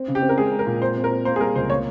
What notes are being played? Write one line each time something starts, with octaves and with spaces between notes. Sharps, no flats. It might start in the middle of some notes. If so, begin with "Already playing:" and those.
Already playing: C4
C#3
G4
C4
A#4
G#3 G#4
G#3
A#4
A#2
C4 C5
C4
A#4
C4
A#3 C5
G#4
G3 A#4
C#2 C5
A#3 C#5